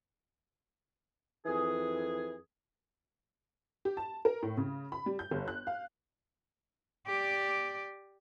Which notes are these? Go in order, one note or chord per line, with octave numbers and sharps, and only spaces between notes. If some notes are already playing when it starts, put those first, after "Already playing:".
F2 E3 G#4
G4
A5
A#4
A2
C#3
B5
G3
G6
G1
F#6
F5
G4 D5